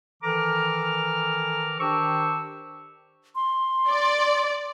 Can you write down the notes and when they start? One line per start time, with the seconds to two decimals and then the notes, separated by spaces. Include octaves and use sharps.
0.23 D#3 E3 A4 A#5 D6 F6
1.80 D#3 D4 G4 C5 C#6 E6
3.35 C6
3.87 D5